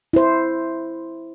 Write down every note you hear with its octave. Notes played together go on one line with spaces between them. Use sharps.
E4 C5